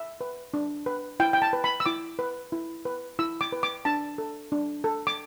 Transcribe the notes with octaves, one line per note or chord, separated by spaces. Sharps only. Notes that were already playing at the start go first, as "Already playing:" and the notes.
Already playing: E5
B4
D4
B4
E4 G5
G5
A5
B4
B5
E6
E4 D6
B4
E4
B4
E4 E6
D6
B4
D6
D4 A5
A4
D4
A4
D6